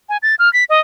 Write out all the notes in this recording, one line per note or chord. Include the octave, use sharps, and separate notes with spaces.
G#5
A6
F6
B6
D#5